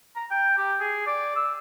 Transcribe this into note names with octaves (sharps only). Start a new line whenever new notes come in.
A#5
G5
G4
G#4
D5
E6